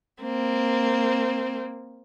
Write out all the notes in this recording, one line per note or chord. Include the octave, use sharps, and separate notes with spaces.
A#3 C4